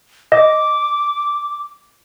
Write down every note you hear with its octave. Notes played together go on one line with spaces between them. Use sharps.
D#5 D6